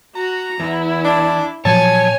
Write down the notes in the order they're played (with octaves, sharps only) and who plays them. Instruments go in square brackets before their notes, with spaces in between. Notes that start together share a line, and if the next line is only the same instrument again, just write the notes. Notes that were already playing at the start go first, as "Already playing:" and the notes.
[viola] F#4 [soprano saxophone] A#5
[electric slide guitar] E2 [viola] E4
[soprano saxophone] D4
[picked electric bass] A#2 F3 F#3 [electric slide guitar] C#5 [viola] G#5 [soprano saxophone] A5